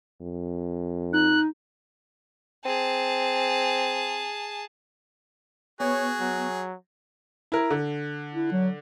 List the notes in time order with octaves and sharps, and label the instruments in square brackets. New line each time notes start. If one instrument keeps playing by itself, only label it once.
[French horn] F2
[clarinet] D#4 [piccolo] F#6
[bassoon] C4 [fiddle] G#4 A5
[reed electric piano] B3 [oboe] F#4 [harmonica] G#4 [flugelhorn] C#5
[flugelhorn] F#3
[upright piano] E4 A#4
D3
[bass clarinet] E4
F#3